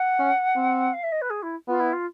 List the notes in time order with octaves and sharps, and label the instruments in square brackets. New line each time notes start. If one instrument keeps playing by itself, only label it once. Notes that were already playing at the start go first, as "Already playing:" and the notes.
Already playing: [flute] F#5
[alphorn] C#4
C4
[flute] F5
E5
D#5
B4
G#4
E4
[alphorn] B3 [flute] F4
[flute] E4
F4